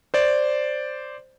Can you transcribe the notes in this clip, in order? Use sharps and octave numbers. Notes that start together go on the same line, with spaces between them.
C5 D5